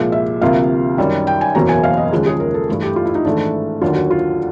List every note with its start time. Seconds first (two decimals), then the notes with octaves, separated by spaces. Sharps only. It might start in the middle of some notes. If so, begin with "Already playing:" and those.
Already playing: C2 A#2 F3 G#3
0.12 E5
0.41 D2 C3 F3 A#3 F5
0.97 F#2 D#3 G3
1.27 G5
1.41 G#5
1.55 F#1 E2 B2 F#3 A#3 A#5
1.69 G#5
1.83 F5
1.97 D#5
2.12 D#2 C#3 F3 G#3
2.26 G#4
2.40 A#4
2.54 A4
2.68 G2 E3 A3
2.82 G4
2.96 F4
3.06 E4
3.15 D#4
3.24 G#1 G#2 E3 A3 D4
3.81 D#2 D3 F#3 A#3 F4
3.96 F#4
4.11 F4